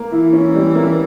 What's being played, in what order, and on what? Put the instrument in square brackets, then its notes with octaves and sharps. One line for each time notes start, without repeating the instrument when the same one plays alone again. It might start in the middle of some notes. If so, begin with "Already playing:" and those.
Already playing: [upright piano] A#3
[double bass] E3 [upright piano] E4
[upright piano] C#4
G3
A#3